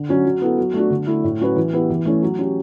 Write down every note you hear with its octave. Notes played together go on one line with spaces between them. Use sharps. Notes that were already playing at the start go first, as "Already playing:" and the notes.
Already playing: D3
F#3 C#4 F#4
F#3
B3 E4 A4
F#3
A3 D4 F#4
D3
A3 E4
A2
F#3 C#4 F#4 B4
E3
B3 E4 G4 B4
E3
A3 C#4 E4
F#3
C#4 G4